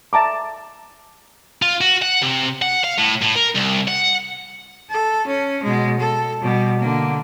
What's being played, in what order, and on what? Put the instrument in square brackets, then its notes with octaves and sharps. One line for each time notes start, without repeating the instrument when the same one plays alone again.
[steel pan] E5 A5 A#5 D6
[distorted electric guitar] F4
F#4
F#5
C3
F#5
F5
A2
A2
A#4
C2
F#5
[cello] A4
C#4
B2 G#3
A4
B2 G3
D3 A#3